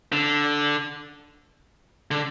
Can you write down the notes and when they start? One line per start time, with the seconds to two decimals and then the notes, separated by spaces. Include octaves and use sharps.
0.12 D3
2.11 D3